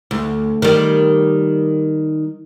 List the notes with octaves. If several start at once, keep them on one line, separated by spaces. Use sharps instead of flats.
D2
D#3 G3